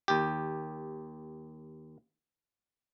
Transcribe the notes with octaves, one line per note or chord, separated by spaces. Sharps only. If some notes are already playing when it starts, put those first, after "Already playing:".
D#2 G4